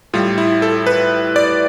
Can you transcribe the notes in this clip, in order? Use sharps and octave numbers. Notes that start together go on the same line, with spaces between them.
A2 G3 F4
E4
A4
B4
D5